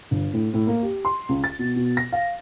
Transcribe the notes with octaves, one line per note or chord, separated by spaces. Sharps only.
G1
A2
A2
A#3
G4
C6
C#2
A6
B2
B2
A#6
F5